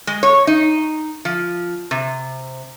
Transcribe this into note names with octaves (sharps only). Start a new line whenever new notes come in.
G#3
C#5
D#4
F3
C3